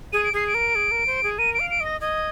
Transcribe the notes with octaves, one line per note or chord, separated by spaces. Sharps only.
G#4 D#7
D7
G#4 C7
D7
A#4
G#4
A#4
C5
G#4
A#4 D#7
D7
F5
D7
D#5
A#6
D#5 G#6